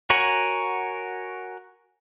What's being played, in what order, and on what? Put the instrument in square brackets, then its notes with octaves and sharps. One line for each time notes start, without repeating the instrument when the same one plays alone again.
[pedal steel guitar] F#4 A#4 C#5 F#5 G#5